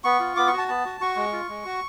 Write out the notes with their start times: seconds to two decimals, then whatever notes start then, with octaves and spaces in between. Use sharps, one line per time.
0.04 B3 C#6
0.20 F4
0.36 B3 D6
0.47 C#6
0.53 F#4
0.58 A5
0.68 B3 A5
0.85 F#4
1.01 F#4 C#6
1.16 G#3
1.33 F4
1.49 G#3
1.65 F#4